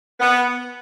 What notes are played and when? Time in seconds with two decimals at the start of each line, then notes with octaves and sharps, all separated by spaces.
0.20 B3